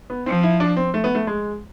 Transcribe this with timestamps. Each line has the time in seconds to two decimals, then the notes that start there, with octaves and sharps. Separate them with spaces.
0.10 B3
0.26 F3 C4
0.43 E4
0.60 D4
0.77 C4
0.94 A3
1.04 B3
1.15 A3
1.27 G#3